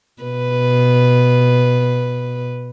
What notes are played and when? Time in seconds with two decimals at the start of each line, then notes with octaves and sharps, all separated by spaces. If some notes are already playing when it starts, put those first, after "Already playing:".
0.23 B2 B4